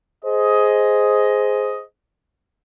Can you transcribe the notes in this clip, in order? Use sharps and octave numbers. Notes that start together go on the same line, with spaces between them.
G#4 C5 D#5